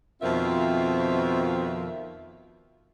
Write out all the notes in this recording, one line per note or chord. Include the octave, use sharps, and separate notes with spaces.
F2 B2 D#3 C4 F4 E5